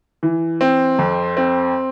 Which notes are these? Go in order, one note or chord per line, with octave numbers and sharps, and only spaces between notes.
E3
C4
F2
C4